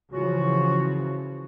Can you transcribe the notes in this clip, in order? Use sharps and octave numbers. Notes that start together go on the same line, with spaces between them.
C#3 E3 F3 C#4 F4 F#4